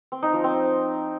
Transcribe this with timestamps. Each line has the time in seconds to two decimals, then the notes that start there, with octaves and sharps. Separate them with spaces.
0.12 C4
0.23 D#4
0.33 F3
0.44 C4